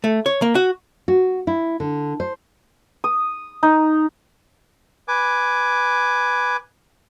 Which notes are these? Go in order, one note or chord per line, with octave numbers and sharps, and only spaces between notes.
A3
C#5
A#3
F#4
F#4
E4
D3
C5
D#6
D#4
B4 G#5 D6